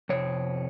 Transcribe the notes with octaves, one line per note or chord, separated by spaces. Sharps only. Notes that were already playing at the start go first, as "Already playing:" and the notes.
F2 C3 C#5